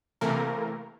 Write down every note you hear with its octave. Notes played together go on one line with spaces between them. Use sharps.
C3 E3 A3 A#3 A#4